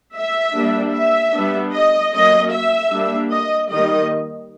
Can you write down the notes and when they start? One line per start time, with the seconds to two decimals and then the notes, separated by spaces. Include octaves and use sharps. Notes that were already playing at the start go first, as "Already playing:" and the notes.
0.15 E5
0.55 G3 A#3 D4
0.95 E5
1.34 G3 B3 D4
1.74 D#5
2.13 F#3 A#3 C#4 D#5
2.53 E5
2.92 G3 A#3 D4
3.31 D#5
3.71 D#3 G3 A#3 D#5